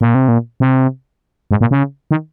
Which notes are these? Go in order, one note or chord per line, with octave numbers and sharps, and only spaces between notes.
A#2
C3
A#2
C3
G#2
A#2
C#3
D#3